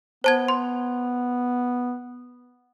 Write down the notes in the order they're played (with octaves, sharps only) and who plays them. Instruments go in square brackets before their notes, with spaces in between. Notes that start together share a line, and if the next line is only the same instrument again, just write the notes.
[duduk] B3 [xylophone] C5 A5 G#6
[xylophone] C6